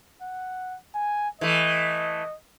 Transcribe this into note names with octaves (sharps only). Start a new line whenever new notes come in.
F#5
G#5
E3 A3 D#5